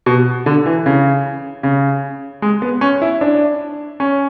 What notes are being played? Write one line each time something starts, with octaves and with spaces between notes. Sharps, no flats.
B2
D3
E3
C#3
C#3
G#3
B3
C#4
E4
D4
C#4